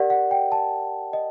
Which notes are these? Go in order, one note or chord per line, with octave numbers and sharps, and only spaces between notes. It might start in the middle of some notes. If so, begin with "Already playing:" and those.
Already playing: G4 A#4 D5 F#5
F#5
G5
A5
D#5